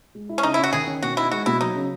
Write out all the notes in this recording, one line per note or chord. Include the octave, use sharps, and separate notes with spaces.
G#3
E4
C#4
C#3 D#4
E4
C#4 F#4
D#3 G#4
C#4
B2 F#4
D#4 E4
G#3 F#4
B2 E4
F#3 D#4
C#3